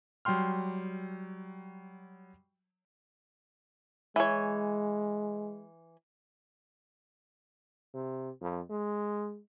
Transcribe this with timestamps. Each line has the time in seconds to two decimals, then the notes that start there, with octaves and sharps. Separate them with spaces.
0.25 F#3 G3 G5 C6 F6
4.16 E3 G#3 C#5
7.94 C3
8.41 F2
8.70 G#3